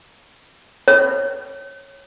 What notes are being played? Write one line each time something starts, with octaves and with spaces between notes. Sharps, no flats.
C#5